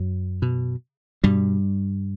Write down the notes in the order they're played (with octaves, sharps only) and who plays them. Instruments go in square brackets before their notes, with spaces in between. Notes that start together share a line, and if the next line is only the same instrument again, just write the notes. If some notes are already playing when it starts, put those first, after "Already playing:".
Already playing: [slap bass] F#2 F#3
B2
G2 B2 G3